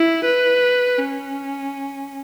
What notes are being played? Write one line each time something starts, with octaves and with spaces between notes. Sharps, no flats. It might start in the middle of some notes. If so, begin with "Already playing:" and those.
Already playing: E4
B4
C#4